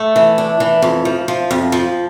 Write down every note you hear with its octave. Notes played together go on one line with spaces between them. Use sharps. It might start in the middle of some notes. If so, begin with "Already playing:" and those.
Already playing: A3
E3
D4
E3
F2
F3
F3
F2
F3